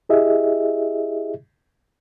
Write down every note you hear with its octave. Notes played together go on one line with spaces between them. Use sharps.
E4 G4 G#4 D#5 E5